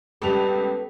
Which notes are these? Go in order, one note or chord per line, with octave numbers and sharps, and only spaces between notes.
C#2 G3 B3 A4 F7